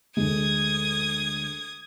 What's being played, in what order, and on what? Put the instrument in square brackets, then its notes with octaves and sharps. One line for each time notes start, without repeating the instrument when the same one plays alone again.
[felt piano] D2 G#3 [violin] D#6 G#6